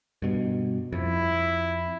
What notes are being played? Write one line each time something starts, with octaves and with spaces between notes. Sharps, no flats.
G2 B2
F2 E4